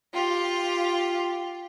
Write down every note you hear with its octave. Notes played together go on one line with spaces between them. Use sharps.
F4 G4